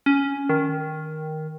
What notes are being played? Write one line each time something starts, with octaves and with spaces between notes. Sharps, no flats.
C#4
D#3